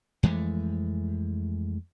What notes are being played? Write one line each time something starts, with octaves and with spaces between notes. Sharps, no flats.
F2 E3 G#3 A3